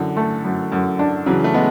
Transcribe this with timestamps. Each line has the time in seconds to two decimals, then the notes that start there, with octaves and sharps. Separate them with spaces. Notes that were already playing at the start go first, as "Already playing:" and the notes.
Already playing: F#2 D3 E3
0.17 A3
0.44 F#2
0.72 F#2
0.99 D4
1.26 C#3 E3 F#3
1.44 A3
1.54 G#3 B3